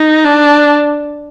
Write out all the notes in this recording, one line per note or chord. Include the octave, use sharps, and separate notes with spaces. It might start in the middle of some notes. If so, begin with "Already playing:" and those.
Already playing: D#4
D4